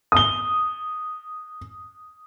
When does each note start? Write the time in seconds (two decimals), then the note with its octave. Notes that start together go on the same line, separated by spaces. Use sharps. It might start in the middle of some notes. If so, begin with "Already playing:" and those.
0.12 D#6 G7